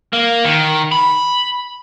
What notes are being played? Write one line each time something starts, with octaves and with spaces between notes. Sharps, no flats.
A#3
D#3
B5